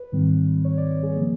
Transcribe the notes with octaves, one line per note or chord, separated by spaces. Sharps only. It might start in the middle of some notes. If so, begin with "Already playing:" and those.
Already playing: B4
G#2 D#3 G3 C4
C#5
D5
D5
G#4
C#3 F3 A#3